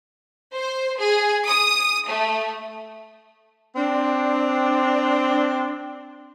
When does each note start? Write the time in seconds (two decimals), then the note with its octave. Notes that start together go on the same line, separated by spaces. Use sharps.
0.56 C5
0.99 G#4
1.49 D#6
2.10 A3
3.76 C4 D4